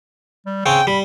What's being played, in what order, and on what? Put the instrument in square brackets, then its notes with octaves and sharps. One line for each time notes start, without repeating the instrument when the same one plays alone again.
[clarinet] G3
[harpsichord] C#3 C4 C#4 [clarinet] G5
[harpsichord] G3 [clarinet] B5